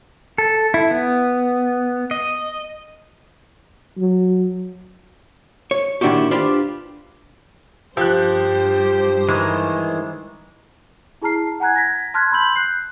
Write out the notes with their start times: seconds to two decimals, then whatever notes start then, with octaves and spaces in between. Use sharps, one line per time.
0.38 A4
0.74 E4
0.91 B3
2.11 D#5
3.98 F#3
5.71 C#5
6.01 A#2 D#3 D4 E4 F#4 G4
6.31 D4 F4 G4 B4 C5
7.97 G2 F3 G4 C5 F#6
9.29 D#3 E3 G#3
11.22 E4 G#4 A5 A#5 F6 C7
11.60 F#5 G#5 A#5 F#6 G#6
11.74 G#6 A#6 B6
12.14 A5 C6 F6 F#6 G#6 B6
12.32 B5 C6 E6 G6 F#7
12.56 F#6 G6 C7